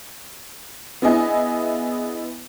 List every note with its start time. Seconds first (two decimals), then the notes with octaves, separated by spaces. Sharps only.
1.02 B3 D4 E4 G#4 D#5 G#5